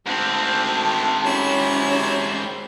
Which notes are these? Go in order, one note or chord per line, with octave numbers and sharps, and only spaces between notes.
D2 G#2 C4 A5
C3 F#3 C#4 E4